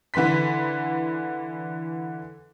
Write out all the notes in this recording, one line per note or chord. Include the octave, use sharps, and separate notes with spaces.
D3 E3 B4 C6 B6